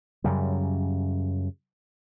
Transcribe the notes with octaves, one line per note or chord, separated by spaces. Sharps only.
F#2 C#3 G3